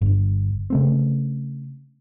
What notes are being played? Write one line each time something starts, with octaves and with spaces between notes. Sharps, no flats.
G1
C#3 A3 C4